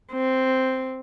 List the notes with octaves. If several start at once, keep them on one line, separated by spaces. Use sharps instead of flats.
C4